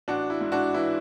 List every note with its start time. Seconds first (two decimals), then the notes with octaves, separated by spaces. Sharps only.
0.08 A1 D4 F#4
0.30 E4
0.41 G#2
0.52 D4 F#4
0.74 E3 E4